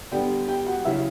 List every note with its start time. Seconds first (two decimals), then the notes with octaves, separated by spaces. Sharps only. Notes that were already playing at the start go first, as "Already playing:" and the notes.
0.11 D3 G3 B3 D4 G4 G5
0.48 G4 G5
0.66 F#4 F#5
0.85 C#3 F#3 C#4 E4 E5